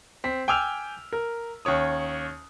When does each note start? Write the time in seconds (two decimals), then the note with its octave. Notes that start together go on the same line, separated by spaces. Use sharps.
0.24 C4 B6
0.48 G5 G#5 D6 E6 F6 F7
1.13 A#4
1.65 D#2 C#4 C#5 D#6